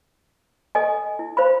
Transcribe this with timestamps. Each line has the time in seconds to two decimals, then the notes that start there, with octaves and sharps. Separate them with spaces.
0.75 A4 D#5 G#5
1.19 E4
1.37 C5 F5 B5